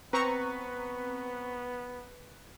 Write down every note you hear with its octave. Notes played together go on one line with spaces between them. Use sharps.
B3 C4 B4 A#5 C#6